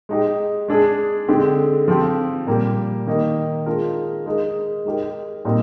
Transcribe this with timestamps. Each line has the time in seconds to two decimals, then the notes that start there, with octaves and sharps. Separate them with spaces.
0.09 G#3 D#4 G4
0.68 G#3 D4 G#4
1.28 D3 G#3 C4 G4
1.88 F3 C4 G4
2.47 A#2 G3 A#3
3.07 D#3 A#3 D#4 A#4
3.66 G#3 D4 F4 A#4
4.26 G#3 D#4 A#4
4.85 G#3 D#4 G4 A#4
5.45 A#2 G3 C4 D#4